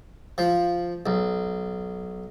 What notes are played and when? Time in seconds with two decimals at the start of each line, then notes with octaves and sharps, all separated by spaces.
0.38 F3
1.06 B1